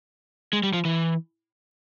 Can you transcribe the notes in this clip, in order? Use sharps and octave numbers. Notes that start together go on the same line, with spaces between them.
G#3
G3
F3
E3